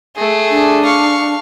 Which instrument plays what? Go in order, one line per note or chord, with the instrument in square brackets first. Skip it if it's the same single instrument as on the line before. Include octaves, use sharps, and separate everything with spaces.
[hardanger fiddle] A3 G#4
[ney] D4
[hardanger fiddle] F5 C#6